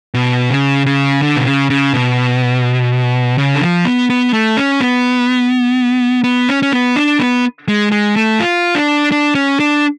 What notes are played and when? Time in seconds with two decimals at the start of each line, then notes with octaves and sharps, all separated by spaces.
0.14 B2
0.50 C#3
0.86 C#3
1.22 D3
1.36 B2
1.46 C#3
1.70 C#3
1.93 B2
3.38 C#3
3.54 D3
3.61 F3
3.85 B3
4.10 B3
4.33 A3
4.57 C#4
4.80 B3
6.24 B3
6.49 C#4
6.62 C#4
6.73 B3
6.96 D4
7.19 B3
7.68 G#3
7.92 G#3
8.16 A3
8.40 F4
8.75 D4
9.12 D4
9.35 C#4
9.60 D4